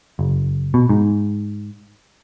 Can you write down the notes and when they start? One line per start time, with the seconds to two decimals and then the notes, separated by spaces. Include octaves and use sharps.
0.19 F#1
0.74 B2
0.89 G#2